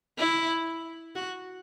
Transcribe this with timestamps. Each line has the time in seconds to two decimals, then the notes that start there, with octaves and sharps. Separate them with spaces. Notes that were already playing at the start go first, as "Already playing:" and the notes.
0.18 E4
1.15 F#4